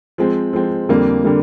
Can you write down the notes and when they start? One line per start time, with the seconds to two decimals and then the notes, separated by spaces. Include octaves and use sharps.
0.18 F3 G#3 C4
0.53 F3 G#3 C4
0.89 F2 D3 G3 A#3
1.24 D3 G3 A#3